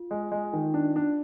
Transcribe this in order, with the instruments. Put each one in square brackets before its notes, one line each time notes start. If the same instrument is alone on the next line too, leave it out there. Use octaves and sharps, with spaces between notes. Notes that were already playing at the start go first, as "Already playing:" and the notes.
Already playing: [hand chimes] F4
[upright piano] G#3
G#3
D#3
D4
D4